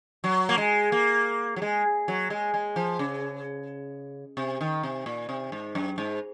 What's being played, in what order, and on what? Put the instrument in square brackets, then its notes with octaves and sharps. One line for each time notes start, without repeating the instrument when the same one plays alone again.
[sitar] F#3
A#3
G#3
A#3
F#3
G#3
F#3
G#3
G#3
F3
C#3
C3
D#3
C3
A#2
C3
G#2
F#2
G#2